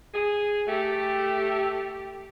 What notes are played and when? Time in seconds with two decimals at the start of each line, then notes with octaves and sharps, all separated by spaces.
0.14 G#4
0.68 A3 G4